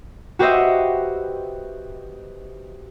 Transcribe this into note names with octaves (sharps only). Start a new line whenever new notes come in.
F#4 G4 B4 C5 D#5 E5